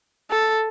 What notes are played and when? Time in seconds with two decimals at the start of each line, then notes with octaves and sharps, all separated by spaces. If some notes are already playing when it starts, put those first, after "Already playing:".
0.31 A4